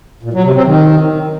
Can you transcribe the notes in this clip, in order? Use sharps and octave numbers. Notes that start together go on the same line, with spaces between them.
A#2
F#3
C3
C4
D#3